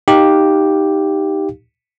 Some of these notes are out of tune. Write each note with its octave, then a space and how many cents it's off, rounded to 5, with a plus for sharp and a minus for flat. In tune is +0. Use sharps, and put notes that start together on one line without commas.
D#4 +0 G4 +0 F5 +0